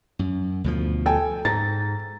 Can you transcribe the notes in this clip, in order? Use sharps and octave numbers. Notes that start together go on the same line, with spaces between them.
F#2
D2 B2 F3
A4 G5 G#5
G#2 A#5 A6